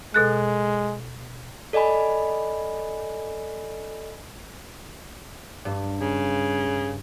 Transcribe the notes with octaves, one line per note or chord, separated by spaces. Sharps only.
B2 G#3 A4 F#6
A4 D5 D#5 G#5 B5
G2
C#3